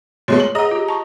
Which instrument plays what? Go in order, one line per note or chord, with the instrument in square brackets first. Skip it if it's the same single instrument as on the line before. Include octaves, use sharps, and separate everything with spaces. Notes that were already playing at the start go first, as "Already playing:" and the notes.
[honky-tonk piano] A#2 G#3 A3 [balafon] F#4 C#5 C6
[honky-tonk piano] F#7
[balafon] G#4 F#5 [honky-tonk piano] D#5 A#5 D#6
[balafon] F4 G4
A5 C#6